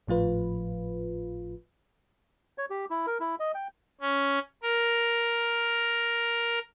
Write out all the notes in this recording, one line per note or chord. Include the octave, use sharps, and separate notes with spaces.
G#1 A2 F3 F4 B4
C#5
G4
E4
A#4
E4
D#5
G5
C#4
A#4